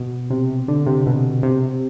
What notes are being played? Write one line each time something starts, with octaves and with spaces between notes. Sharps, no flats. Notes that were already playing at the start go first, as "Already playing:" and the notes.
Already playing: B2
C3
D3
C3
B2
C3